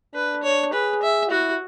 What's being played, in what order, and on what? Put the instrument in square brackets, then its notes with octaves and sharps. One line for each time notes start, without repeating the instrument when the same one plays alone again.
[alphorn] D4 [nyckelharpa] B4
[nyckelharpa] C#5
[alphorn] G#4 [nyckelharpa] B4
[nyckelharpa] E5
[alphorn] E4 [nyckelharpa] F#4